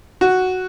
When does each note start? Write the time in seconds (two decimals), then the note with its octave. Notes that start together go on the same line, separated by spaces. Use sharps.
0.21 F#4